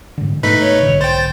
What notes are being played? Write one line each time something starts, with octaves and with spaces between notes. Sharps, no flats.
G#2 D3
G#2 B2 A3 B3 D#4 B4 B6
C#5
B1 G#2 D3
C5 G5 A6